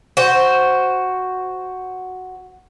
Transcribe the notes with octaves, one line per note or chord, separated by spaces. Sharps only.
F#4 C5